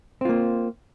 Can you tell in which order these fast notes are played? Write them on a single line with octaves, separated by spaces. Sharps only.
C4 F4 A#3